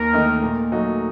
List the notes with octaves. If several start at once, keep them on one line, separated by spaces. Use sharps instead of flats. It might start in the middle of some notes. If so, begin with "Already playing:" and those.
Already playing: D#2 A#4
D#3 A3 D#4
A#2
F#3 A3 D#4 F#4